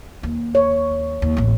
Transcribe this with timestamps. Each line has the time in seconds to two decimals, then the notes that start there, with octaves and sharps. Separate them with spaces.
0.23 D#2
0.55 C#5
1.22 D#2
1.37 D1 A1